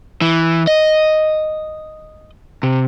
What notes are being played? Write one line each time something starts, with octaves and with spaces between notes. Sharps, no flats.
E3
D#5
C3